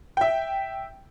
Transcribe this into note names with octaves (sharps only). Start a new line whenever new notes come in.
E5 G5